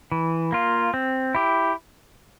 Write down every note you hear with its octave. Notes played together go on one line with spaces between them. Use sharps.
E3
A#3 F4
C4
E4 G4